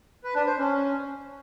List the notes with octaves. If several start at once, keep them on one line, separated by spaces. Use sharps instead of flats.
B4
D4
C5
C#4